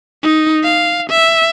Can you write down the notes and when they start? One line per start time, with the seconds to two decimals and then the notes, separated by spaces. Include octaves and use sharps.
0.23 D#4
0.64 F5
1.10 E5